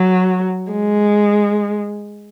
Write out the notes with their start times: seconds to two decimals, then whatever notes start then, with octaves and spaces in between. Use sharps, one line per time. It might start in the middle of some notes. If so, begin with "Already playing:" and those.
Already playing: F#3
0.72 G#3